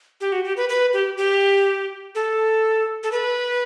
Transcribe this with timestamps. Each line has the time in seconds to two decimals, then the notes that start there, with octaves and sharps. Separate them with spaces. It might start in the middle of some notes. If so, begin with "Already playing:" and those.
0.21 G4
0.32 F#4
0.44 G4
0.57 B4
0.69 B4
0.93 G4
1.17 G4
2.15 A4
3.03 A4
3.12 B4